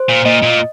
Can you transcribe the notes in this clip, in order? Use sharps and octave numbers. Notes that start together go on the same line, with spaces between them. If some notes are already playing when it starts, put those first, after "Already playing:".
Already playing: C5
A#2
A#2 D#5
A#2